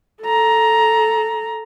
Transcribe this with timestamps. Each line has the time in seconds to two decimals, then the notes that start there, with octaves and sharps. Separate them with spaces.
0.23 A4 A#5